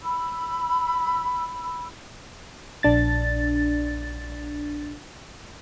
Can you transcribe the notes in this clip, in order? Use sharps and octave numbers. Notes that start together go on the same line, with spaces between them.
B5 E6
A#1 D4 A6